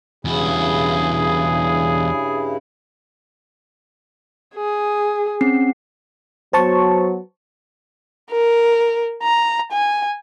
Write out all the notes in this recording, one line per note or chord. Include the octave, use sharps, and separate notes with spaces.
E2 G2 C#3 E4 F#4 G#4
G#4
C4 C#4 C7
F#3 B3 C5 A5 C#6
A#4
A#5
G#5